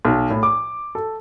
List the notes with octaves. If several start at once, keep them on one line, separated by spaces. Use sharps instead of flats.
B1
A2
D6
A4